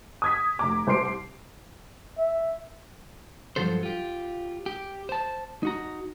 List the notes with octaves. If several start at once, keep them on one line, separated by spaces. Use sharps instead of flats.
D#6 G#6 B6
F1 A#5 D6
C2 C5 C6 D6 C7 D7
E5
G2 C#3 F3 F#3 A4 C5
F4 G4
G4
C5 A5
D#4 F#4 A#5